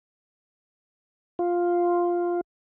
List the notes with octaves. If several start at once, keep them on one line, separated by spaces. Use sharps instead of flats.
F4